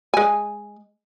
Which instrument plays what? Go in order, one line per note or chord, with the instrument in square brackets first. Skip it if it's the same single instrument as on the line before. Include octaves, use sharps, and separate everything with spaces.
[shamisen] G#3 G#5